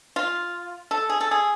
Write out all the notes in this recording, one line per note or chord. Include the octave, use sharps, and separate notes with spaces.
F4
A4
G#4
A4
G#4